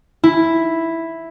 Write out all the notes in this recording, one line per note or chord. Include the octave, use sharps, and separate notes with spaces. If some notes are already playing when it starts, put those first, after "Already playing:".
E4